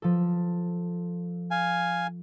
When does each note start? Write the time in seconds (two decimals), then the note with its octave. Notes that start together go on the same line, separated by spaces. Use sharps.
0.02 F3 A4
1.51 F5 G#5